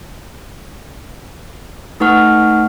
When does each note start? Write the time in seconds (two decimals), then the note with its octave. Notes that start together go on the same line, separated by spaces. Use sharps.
2.00 A3 D#4 B4 F#5 C#6 F6